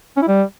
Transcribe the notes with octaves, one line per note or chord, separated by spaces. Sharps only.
C#4
E4
G3